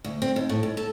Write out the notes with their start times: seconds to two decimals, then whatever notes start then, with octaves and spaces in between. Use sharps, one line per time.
0.04 D2
0.22 C4
0.36 D#2
0.49 A2
0.63 D#2
0.77 A4